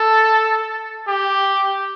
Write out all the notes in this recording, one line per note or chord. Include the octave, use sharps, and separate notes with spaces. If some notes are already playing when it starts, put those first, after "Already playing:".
Already playing: A4
G4